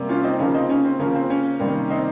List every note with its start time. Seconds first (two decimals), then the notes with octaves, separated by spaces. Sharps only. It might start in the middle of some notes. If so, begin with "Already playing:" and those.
Already playing: C3 G3 A#3
0.09 C#4 F4
0.24 C4 D#4
0.39 C#3 F3 A#3 C#4
0.54 C4 D#4
0.69 C#4
0.84 C4
0.99 C#3 F3 A#3 C#4
1.15 C4
1.30 C#4
1.60 C3 D#3 G3 A#3
1.90 C4 D#4